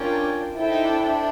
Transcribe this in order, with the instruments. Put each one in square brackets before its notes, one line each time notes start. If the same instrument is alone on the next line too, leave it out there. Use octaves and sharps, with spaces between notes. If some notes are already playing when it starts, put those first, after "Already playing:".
Already playing: [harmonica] C#4 [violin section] D4 F4 A#4 D5 G5
[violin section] E4 A4 C5 E5 G5
[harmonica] D#4
D4
D4